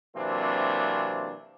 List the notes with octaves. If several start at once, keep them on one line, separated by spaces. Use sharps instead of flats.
C3 E3 F#3 A#3 C4 D4